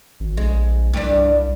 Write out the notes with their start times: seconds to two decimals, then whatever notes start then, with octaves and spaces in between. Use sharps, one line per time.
0.20 G#1
0.37 A#1 G#3
0.93 C2 G2 D4